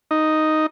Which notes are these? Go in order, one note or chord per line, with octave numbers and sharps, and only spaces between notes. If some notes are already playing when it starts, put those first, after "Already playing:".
D#4